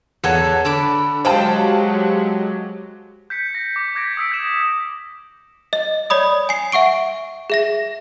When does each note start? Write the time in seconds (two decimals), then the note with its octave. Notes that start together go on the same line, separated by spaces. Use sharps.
0.24 E2 A4 B4 C#5 F#5
0.65 D3 A5 B5 D6
1.25 F#3 G#3 G4 G#4 C5 F5 G5 A5
3.30 G6 B6 C#7
3.55 A#6
3.76 D6
3.95 D6 G6 G#6 A#6 B6 D7
4.17 D#6 E6 B6 D7
4.30 D#6 G6 E7
5.73 D#5
6.10 C#5 D5 B5 D#6
6.49 G#5 C7
6.72 E5 F#5 C#6 D7
7.50 G#4 E5 A#6